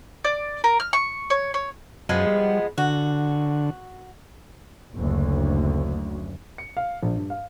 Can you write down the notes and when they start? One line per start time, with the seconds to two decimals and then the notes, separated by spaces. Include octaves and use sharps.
0.25 D5
0.64 A#4
0.80 F6
0.93 C#6
1.30 C#5
1.54 C#5
2.09 F#2 F3 G#3 B3
2.27 G3
2.78 D3 F#4
4.96 F#1 D2
6.58 C#7
6.77 F5
7.03 A#1
7.17 G2
7.30 F5